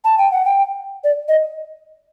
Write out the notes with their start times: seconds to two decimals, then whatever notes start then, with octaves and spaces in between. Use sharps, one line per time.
0.04 A5
0.18 G5
0.32 F#5
0.45 G5
1.04 D5
1.28 D#5